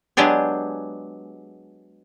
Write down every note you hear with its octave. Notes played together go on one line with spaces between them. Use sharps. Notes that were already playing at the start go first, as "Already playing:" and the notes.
F#3 G#3 B3 D4 G4 G#4